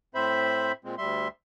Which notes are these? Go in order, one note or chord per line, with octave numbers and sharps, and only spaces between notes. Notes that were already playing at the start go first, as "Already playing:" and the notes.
A2 C4 C5 E5 B5
A#2 G#3 C4
D2 G3 E5 C6